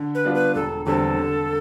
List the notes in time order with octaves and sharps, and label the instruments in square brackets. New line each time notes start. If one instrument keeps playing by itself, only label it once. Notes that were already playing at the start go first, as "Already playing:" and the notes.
Already playing: [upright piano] D3
[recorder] B4
[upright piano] G3 B3 D4 F4
[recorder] B4
[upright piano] E1 [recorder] A4
[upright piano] E2 D3 G3 C4 [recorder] A4
[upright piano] D3